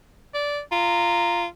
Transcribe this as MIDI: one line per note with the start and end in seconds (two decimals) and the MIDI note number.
0.34 0.61 74
0.72 1.46 65
0.72 1.45 82